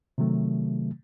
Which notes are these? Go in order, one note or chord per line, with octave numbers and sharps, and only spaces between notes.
C3 D#3 F#3 A3